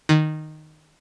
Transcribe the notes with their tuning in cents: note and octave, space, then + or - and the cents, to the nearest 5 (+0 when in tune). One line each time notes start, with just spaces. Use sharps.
D#3 -10